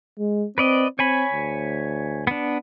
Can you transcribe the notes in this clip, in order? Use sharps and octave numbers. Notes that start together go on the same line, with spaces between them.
G#3
C4 B4 D5 D#5
C4 C#5 G#5 B5
D2
B3 D4